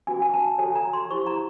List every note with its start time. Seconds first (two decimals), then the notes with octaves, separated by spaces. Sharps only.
0.07 C#4 F#4 B4 G#5
0.22 G#5
0.34 A5
0.58 F#4 A4 C#5 G#5
0.75 A#5
0.93 C6
1.10 E4 G4 C5 C#6
1.27 A#5